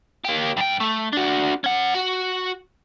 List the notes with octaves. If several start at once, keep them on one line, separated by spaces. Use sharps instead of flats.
A#3 G4
G2 G5
A3
D4 F#4
C#4 F#5
F#4